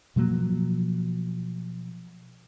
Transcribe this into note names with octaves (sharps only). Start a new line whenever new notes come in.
B2 F3 F#3 A#3